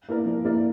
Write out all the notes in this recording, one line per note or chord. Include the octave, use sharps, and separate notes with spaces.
A#3 E4 A#4 D5
F3
A#3 E4 A#4 D5